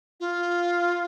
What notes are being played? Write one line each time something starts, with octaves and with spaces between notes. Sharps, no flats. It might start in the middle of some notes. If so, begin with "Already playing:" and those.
F4